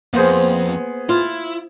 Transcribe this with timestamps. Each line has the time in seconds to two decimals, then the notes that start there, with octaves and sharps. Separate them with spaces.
0.14 F2 A#3 B3 G#4 C5
1.09 E4 F4